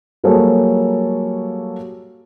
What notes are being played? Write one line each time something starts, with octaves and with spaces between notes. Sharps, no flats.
F#3 G3 A#3 G#4 A4 C#5